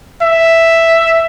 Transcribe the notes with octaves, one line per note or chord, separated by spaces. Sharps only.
E5